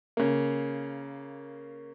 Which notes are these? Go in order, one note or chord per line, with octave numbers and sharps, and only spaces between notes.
C#3 A#3